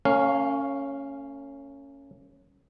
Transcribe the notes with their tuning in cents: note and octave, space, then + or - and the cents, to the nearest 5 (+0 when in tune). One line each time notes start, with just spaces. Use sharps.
A#3 -45 C#4 +0 F5 +0